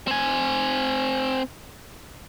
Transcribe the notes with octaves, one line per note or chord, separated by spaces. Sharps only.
C4 G#5